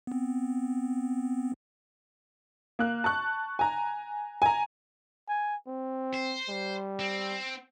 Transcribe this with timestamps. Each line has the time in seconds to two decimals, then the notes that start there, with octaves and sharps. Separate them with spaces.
0.07 B3 C4
2.79 A#3 F#6
3.04 A5 C#6 F#6
3.59 G#5 A#5
4.42 G#5 A#5
5.29 G#5
5.67 C4
6.14 C5
6.49 G3
7.00 C4